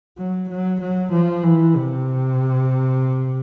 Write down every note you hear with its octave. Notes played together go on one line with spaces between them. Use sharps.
F#3
F#3
F#3
F3
E3
C3